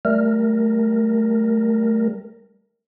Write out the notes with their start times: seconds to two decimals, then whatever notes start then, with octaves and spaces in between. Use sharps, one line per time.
0.05 G3 A3 A#4